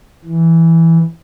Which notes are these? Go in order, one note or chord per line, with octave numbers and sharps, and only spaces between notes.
E3